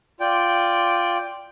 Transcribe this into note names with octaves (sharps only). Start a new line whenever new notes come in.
F4 D5 G5